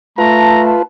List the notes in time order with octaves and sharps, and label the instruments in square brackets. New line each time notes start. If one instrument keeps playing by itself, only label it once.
[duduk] A3 [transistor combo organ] F4 B4 [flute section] A5 [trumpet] A#5